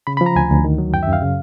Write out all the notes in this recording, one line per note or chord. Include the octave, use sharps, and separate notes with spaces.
C#3 B5
B5
F3
A#5
D2 G#5
D2
D#3
F#3
F#2 G5
E5
F#2
F5
C#3